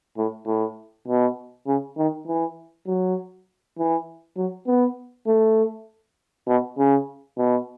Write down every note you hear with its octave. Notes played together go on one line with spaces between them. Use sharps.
A2
A2
B2
C#3
D#3
E3
F#3
E3
F#3
B3
A3
B2
C#3
B2